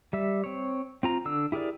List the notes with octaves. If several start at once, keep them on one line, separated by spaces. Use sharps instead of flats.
G3 E5
C4 C#5
C4 F4 A#5
D3 D4 E6
E4 G4 G#4 A#4 D5